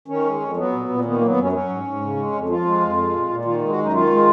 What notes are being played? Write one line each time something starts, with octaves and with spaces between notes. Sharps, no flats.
D#3 C#4
G#3
F2
F#3 B3
A#2
A#2
D#3 B3
A#3
F#3
B3
F#2 C#4
F#3 C#4
G#2
G#2
C#3
G#3
F2
F3 F4
G#3
F2
G#3
A#2
A#2
D#3 F4
G#3
F#4
F#2 D#4
D#3 F4
G#3